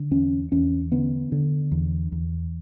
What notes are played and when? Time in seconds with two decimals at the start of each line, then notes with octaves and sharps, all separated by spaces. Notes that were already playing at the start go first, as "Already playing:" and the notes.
Already playing: D3
0.11 E2 C#4
0.52 E2 C#4
0.92 D3 B3
1.32 D3
1.72 E2
2.12 E2